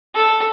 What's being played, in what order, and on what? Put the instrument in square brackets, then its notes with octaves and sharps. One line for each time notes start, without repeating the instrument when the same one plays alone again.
[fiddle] A4